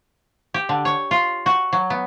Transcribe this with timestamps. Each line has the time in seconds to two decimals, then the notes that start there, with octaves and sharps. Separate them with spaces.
0.54 G4
0.69 D3
0.85 C#5
1.11 F4
1.46 F#4
1.73 F#3
1.90 B3